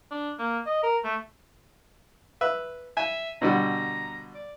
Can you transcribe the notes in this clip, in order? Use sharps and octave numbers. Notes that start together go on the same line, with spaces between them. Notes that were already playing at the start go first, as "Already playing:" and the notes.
D4
A#3
D#5
A#4
A3
B4 E5
E5 G#5
B2 D3 G3 A#5
D5